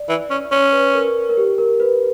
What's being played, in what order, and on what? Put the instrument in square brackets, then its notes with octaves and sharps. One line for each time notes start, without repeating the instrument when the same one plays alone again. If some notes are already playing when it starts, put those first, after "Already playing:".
Already playing: [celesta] D5
[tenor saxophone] E3
C#4
[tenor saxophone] C#4 [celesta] C#5
[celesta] B4
A#4
A#4
G4
A#4
B4